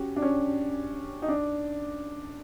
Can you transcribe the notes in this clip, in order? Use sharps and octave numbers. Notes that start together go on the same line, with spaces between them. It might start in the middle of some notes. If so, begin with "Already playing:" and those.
Already playing: C#4 F#4 G4
D4
C#4
D#4
D4